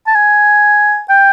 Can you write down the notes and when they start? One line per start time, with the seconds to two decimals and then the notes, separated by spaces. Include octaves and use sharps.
0.07 A5
0.15 G#5
1.09 G5